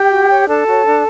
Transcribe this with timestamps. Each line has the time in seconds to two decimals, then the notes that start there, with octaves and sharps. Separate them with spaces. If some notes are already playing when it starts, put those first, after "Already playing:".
Already playing: G4 G5
0.11 F#4
0.29 C#5
0.48 D4 A4 A5
0.66 F#4 C#5
0.84 D4